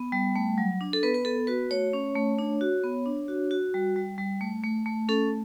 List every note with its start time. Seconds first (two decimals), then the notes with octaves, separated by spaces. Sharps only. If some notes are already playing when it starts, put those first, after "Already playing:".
Already playing: B3
0.12 G3
0.36 A3
0.58 F#3
0.81 D4
0.93 A4
1.03 B3 B4
1.14 B4
1.25 B3 A4
1.47 F#4 B4
1.71 A3 C#5
1.93 C#4
2.15 A3
2.39 D4
2.61 F#4
2.84 B3
3.06 D4
3.28 F#4
3.51 F#4
3.74 G3
3.96 G3
4.18 G3
4.41 A3
4.63 A3
4.86 A3
5.09 C#4 A4